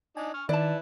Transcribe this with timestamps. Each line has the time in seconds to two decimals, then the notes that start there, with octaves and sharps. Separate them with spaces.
0.17 D4 D#4 G#5
0.34 C#6 F6
0.49 D#3 E4 B4 D5 A5